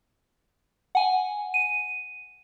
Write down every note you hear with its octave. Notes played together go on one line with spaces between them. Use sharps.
F#5 G#5
D#7